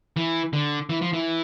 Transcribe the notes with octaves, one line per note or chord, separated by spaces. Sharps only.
E3
D3
E3
F3
E3